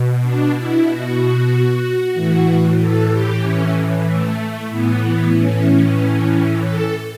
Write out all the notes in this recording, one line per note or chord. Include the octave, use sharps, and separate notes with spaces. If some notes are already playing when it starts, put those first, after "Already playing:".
Already playing: B2
D4
E4
F#4
A2 E3
A4
G4
C#4
A3
A2 E3 B3
C#4
A4